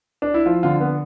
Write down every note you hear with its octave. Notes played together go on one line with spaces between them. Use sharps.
D4
E4
F3 F4
D3 F4
B3